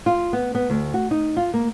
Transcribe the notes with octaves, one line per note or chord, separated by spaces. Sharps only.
F4
B3
B3
D2
F#4
D#4
F4
A#3